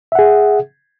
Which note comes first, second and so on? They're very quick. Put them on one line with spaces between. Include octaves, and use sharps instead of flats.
E5 F#5 G#4